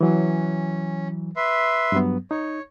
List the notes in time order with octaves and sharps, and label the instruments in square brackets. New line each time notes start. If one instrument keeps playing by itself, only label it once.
[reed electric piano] E3 F#3 [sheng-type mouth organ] C#4
[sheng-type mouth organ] B4 E5 C6
[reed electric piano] G2 F#3 B3
[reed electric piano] D#4 [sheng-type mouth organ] C#5